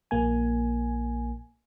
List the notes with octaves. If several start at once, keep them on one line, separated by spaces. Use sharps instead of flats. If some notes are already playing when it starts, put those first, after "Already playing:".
A#1 A#3 G#5